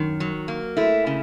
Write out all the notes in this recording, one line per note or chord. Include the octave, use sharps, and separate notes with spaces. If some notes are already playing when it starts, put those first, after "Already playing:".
Already playing: F#2 D#3
F#3
A#3
A3 E4
C#3